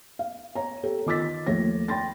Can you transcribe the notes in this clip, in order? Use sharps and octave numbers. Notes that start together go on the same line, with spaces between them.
F5
C#5 A#5
G4 A4 C#5
D#3 F4 D6 E6 A6 B6
D#2 F3 A3 C#5 A#6
G5 B5 C6 A6 A#6